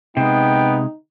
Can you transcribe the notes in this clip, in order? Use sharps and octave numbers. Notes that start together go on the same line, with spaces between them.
C3 G#3 B3 D#4 G5